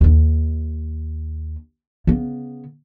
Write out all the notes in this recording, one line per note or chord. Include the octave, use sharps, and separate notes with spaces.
D#2 D#4
C#3 B3